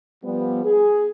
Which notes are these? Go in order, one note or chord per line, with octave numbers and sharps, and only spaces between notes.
F3 G3 B3
G#4